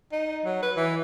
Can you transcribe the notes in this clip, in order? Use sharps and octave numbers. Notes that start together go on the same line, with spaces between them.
D#4
F#3
B4
E3